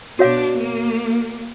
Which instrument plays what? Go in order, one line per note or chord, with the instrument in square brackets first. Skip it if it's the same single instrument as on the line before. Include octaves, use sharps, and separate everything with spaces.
[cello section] B2 D4 [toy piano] F#4 C#5 F5
[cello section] A#3